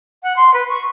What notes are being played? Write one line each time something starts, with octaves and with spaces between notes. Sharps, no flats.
F#5
C6
B4
C#6